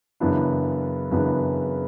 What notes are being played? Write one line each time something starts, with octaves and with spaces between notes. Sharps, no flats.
F#2 C#3 E3 B3 D4
F#2 C#3 E3 B3 D4